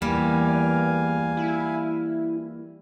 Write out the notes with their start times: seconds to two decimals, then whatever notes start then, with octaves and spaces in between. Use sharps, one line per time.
0.02 E2 E3 G3 A#3 F5 G#5
1.37 E4